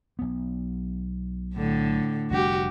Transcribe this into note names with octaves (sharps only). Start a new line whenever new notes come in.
B1 B3
A2 D3
F1 G3 D4 F#4 G4